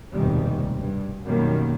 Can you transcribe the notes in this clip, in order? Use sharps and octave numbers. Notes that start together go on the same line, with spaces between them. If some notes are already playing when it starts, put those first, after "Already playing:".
F1 D#2 G#2 B2 D#3 G3
G2
F#2 B2 D#3 G3 A#3